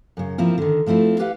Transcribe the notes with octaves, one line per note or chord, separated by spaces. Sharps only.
F#2 C#3
F3 A#3 C4 E4 F4
D3 D#3
F3 A3 C4 E4 F4
G4 B4 F5 F#5